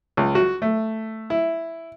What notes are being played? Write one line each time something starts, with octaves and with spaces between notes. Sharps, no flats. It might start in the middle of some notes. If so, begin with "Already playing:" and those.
C#2
F#4
A3
E4